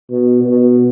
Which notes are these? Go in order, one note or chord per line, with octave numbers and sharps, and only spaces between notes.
B2
B2